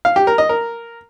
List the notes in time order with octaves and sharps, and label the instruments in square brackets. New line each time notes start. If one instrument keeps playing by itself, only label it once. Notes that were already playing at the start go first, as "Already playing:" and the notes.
[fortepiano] F5
G4
A#4
D#5
A#4